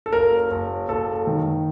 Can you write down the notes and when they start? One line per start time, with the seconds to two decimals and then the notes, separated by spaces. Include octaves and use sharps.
0.06 A4
0.12 F#1 A#4
0.51 F#1
0.89 F#1 A4
1.27 D#3